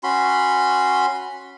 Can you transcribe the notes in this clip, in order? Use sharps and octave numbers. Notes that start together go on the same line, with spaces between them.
C#4 F#4 B5 C6